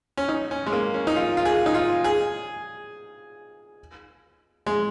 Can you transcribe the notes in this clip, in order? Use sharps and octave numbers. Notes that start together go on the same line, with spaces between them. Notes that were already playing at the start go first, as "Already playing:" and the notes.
C#4
D#4
C#4
G#3
A#3
C#4
D#4
F4
F4
G#4
D#4
F4
G#4
G#3